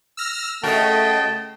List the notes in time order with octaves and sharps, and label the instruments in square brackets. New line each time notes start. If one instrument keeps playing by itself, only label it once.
[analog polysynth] E6 F6 A#6
[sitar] C#3 F#4 A#4 [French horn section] A3 [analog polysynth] D#5 G5 [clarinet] A5